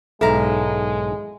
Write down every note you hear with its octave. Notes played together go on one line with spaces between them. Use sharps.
B1 G#2 G#3 E4 A4 F5 A#5